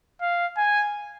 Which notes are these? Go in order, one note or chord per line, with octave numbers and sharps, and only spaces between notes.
F5
G#5